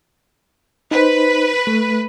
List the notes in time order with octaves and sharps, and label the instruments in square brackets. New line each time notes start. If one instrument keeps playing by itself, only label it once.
[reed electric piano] D#4 C5 [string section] B4
[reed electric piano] A3